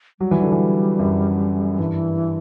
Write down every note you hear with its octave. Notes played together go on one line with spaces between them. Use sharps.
F#3 G3
E3
D3
E3
F#2
G2 E3